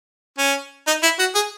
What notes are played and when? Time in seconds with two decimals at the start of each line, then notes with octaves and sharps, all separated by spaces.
0.38 C#4
0.87 D#4
1.03 E4
1.19 F#4
1.35 G#4